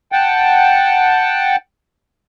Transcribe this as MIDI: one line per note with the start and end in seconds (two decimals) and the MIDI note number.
0.12 1.56 78
0.12 1.56 79
0.12 1.56 81